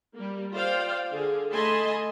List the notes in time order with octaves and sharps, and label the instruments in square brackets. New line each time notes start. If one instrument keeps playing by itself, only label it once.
[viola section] G3 A#3
F4 C5 D5 F5 G5
D3 G#4
A3 D#5 G#5 A5 B5 C6